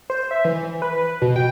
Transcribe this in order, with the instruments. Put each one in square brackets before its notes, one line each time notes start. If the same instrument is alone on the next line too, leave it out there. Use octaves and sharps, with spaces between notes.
[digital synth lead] C5
E5
E3
B4
B2
G5